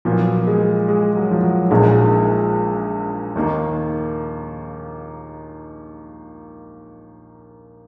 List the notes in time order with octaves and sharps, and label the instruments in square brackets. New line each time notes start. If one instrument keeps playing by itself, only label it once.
[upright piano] A#2 F#3 B3 [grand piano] F3
[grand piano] G#3
G#3
F#3
F3
F#3
[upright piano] A#1 A#2 G#3 D#4 F#4 [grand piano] F3
[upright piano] D#2 D#3 A#3